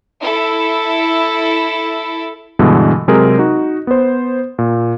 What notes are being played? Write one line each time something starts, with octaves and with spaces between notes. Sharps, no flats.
E4 A4
G2 B2 D3 E3 G#3
C3 F#3 G#3 C4 G#4 A#4
D#4 F#4
B3 C5
A#2